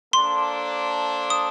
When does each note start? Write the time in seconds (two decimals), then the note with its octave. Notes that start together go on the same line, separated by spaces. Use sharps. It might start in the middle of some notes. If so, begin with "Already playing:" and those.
0.13 A#3 D4 A4 C5 C6
1.30 D#6